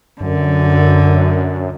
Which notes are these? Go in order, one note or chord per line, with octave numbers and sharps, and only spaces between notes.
F#2 D3